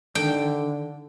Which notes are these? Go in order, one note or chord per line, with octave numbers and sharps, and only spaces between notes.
D3 D#3 D4 A4 G5